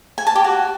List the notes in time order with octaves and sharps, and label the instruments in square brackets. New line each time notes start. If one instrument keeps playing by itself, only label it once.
[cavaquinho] G#5
A5
G4
F#4